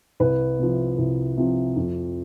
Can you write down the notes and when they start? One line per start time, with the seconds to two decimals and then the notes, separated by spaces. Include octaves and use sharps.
0.20 C2 B4
0.59 C3 F3
0.98 C2
1.37 C3 F3
1.76 F2